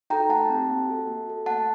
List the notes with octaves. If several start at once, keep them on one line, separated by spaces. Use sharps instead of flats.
D#4 F#4 A4 G5 A#5
A3 F#5 A5
C4 G4
A#3
F#4 A4
A#3
F#4 A4
A3 F#5 A5